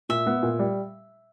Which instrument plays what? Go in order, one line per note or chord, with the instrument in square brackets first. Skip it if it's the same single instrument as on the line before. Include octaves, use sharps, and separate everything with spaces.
[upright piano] A#2 [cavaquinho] E5
[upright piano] B3
A#2
G3